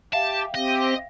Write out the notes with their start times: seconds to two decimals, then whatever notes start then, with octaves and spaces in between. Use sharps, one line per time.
0.13 G4 E5 F5 G5 A5
0.55 C4 G4 D#5